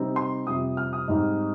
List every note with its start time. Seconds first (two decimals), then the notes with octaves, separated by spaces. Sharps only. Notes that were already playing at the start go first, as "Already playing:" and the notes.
Already playing: C3 G3 C4 D#4
0.16 C6
0.46 F2 C3 G3 D#6
0.77 F6
0.93 D#6
1.08 G#2 G3 C4 D#4